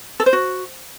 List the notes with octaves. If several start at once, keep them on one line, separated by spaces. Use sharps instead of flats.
A4
C5
F#4